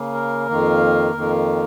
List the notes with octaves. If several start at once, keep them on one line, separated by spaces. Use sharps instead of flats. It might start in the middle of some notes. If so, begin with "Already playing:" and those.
Already playing: C#3 A#3
A#4
F2 D#3 A#3
F2 D#3 A#3